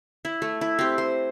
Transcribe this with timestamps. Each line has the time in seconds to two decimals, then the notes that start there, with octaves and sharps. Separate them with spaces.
0.25 E4
0.42 A3
0.61 E4
0.79 C4 G4
0.98 C5